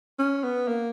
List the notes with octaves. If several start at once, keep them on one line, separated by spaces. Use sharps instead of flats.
C#4
B3
A#3